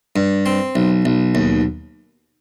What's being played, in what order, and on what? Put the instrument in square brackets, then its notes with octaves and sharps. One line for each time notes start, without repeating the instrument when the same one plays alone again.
[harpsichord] G2
C4
B1
B1
D#2